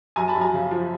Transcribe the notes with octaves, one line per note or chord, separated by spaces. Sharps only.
F#2 G#5 A#5
A5 B5
F#2
G#5 A#5
C#3
F3